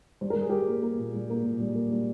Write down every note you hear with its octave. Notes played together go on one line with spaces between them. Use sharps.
G3 C5
A#4
G3 G#4
G3 G4 A#4
A#3
A#3
A#2
G3
A#3
A#2
G3
A#3
G3